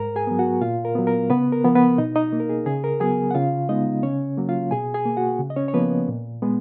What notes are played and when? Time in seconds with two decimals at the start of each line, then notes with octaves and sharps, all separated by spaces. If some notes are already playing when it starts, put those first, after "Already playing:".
Already playing: G#2 A#4 A#5
0.16 G#4 G#5
0.27 F#3 B3
0.39 F#4 F#5
0.61 A#2 F4 F5
0.85 A#4
0.95 F#3 B3
1.07 A#4
1.30 C#3 B3 B4
1.52 A#4
1.64 F3 B3
1.75 B3 B4
1.98 B2 D#4 D#5
2.16 D#4 D#5
2.33 A#3
2.40 A#4
2.50 G#4
2.66 C#3 G#4
2.84 A#4
3.00 F#3 B3 G#4 G#5
3.31 F#5
3.34 C#3 F4 F5
3.69 G#3 B3 D#4 D#5
4.03 C#3 C#4 C#5
4.38 F#3 A#3
4.49 F4 F5
4.71 B2 G#4 G#5
4.94 G#4 G#5
5.05 A#3
5.17 F#4 F#5
5.39 C#3
5.50 D#5
5.56 C#4 C#5
5.68 C#5
5.74 F3 A#3 B3 B4
6.08 A#2
6.42 G#3 B3